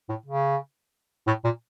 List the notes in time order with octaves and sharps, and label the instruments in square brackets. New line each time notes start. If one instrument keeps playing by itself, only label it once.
[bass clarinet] A2
C#3
A2
A#2